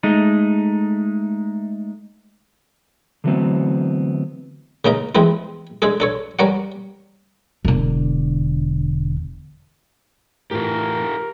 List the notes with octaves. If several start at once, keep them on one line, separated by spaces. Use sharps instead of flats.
G#3 A3 D#4
D3 E3 F#3 A3 B3 C4
C#3 A#3 D#4 A#4
E2 F3 G#3 C4 E4
G#3 D4 G#4 A4
D4 A4 C#5
G3 C#4 A#4 D5 F#5
E1 D3
A2 E3 F4 G4 A#4